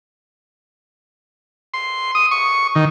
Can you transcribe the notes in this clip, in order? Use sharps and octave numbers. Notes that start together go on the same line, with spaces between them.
C6
D#6
C#6
D#3